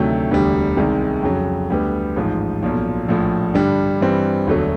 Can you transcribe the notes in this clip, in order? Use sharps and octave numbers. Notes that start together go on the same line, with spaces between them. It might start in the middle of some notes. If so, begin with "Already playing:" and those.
Already playing: D2 C3 D#3 F#3 A3
E1 D2 D3 G3
C2 C3 D#3 G#3
F2 C#3 F#3
D2 D3 G3 B3
A1 G#2 F3
B1 A#2 F3
A#1 A2 F3
G2 D3 G3
G2 E3 G3 C4
E1 D2 D3 F#3 A3